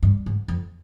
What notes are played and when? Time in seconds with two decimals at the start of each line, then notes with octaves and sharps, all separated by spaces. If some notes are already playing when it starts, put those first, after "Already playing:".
0.03 G2
0.26 G#2
0.48 F2